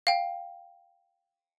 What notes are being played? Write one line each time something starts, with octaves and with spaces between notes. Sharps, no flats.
F5 G5